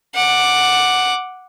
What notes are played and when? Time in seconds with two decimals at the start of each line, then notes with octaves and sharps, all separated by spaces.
0.15 F#5 D6